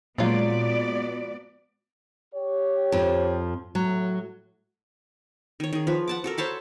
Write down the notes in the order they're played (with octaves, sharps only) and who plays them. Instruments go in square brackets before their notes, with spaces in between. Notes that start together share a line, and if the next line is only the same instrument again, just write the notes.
[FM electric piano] A#2 G#3 [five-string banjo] F3 F#3 F4 [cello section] B3 D5
[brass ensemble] G4 C#5
[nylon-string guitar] F2 F3
[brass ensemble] A2 [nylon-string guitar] F#3
[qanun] D#3 C#5
D#3 G#4
F3 B4
F#5 A5 D6
F#4 A4 A#4
C5 C#5 A5 B5